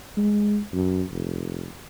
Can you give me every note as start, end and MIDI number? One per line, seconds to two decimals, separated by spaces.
0.17 0.59 56
0.73 1.03 42
1.11 1.67 29